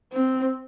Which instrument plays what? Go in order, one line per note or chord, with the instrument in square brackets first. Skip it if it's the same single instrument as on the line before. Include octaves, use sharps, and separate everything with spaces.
[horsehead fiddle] C4